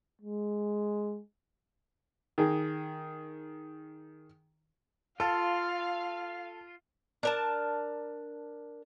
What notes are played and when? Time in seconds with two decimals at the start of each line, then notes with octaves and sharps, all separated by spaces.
0.22 G#3
2.38 D#3 G#4
5.20 F4 A4 F5
7.23 D4 A#4 A5